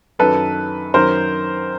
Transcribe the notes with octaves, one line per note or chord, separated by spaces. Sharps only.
F#2 D#3 F#3 A4 B4
F#2 D#3 F#3 A#4 C5